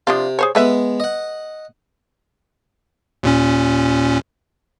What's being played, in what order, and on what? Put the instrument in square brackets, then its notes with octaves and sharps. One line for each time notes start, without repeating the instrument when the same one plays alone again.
[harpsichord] C3 [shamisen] F3 D4 F4
[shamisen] G#4 C5 C#5
[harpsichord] G#3 B3 [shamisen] A4 B4 E5
[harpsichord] D#5 F#5
[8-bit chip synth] D#2 A#2 C#4